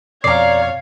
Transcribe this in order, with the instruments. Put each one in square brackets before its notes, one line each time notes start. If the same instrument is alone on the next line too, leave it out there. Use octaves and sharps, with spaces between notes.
[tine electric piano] F2 B2 [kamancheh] C#5 F5 [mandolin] D5 A#5 [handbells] C7